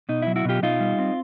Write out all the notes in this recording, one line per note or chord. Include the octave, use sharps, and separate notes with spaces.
B2 D#4
E4
F#3
E4 F#4
B2 F4 G4
B2 D#4 F4
G3
C4